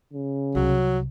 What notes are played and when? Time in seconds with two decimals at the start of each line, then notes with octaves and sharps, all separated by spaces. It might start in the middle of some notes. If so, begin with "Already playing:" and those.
0.13 C#3
0.55 C2 F#3